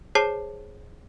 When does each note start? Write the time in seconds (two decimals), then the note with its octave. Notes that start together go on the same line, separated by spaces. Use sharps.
0.15 G#4 C5 C#5 A5 C7